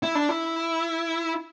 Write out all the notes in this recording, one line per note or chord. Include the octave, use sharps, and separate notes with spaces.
E4
D4
E4